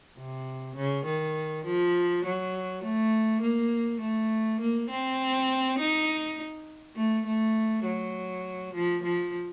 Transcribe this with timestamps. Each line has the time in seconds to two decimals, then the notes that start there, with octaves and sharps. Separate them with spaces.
0.18 C3
0.76 C#3
1.05 D#3
1.65 F3
2.25 F#3
2.83 A3
3.41 A#3
4.00 A3
4.60 A#3
4.90 C4
5.79 D#4
6.96 A3
7.26 A3
7.85 F#3
8.74 F3
9.03 F3